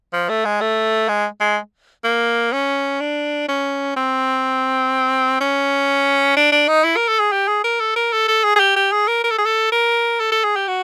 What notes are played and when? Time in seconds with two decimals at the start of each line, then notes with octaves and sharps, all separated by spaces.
0.13 F3
0.29 A3
0.45 G#3
0.61 A3
1.09 G#3
1.41 G#3
2.04 A#3
2.53 C#4
3.01 D4
3.49 C#4
3.96 C4
5.41 C#4
6.37 D4
6.52 D4
6.68 D#4
6.84 E4
6.97 A#4
7.08 A4
7.20 G#4
7.32 G4
7.48 G#4
7.64 A#4
7.80 A4
7.96 A#4
8.12 A4
8.28 A4
8.44 G#4
8.56 G#4
8.60 G4
8.76 G4
8.92 G#4
9.08 A#4
9.24 A#4
9.31 A4
9.38 G#4
9.45 A4
9.72 A#4
10.20 A4
10.32 A4
10.44 G#4
10.56 G4
10.68 F#4